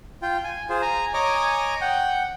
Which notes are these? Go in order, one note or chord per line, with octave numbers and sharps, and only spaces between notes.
F4 G5
G#5
F4 G#4 C5
G#5 A#5
C#5 D#5 G#5 A#5 D6
F#5 G5